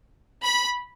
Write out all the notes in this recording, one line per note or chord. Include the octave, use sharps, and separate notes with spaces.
B5